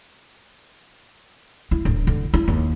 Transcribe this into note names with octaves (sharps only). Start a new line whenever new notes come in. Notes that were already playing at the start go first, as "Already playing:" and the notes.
E4
D1
D3
E4
D#2